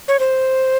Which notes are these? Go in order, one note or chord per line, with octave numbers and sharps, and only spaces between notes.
C#5
C5